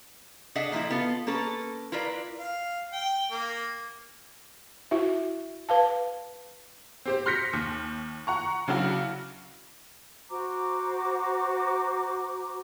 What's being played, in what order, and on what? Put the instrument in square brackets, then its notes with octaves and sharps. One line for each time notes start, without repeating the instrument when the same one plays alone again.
[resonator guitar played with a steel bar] D4 G#4 A4 D#5 E5 F#5
A#2 F3 D#4 E4
B3 F4 A4
A#3 C#4 A4 B4
E4 F4 A#4 B4 D5
[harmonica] F5
G5
A#3
[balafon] E4 F#4 E5
B4 F5 A5
[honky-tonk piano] C4 G4 C5
C6 F6 G6 A#6 B6 C#7
D#2
F#5 A#5 C#6
C#3 F#3 D4 E4 F#4
[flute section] F#4 C5 A#5 D6